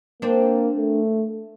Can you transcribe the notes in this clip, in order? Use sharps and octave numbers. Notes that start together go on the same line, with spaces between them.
A#3 C4 D4
A3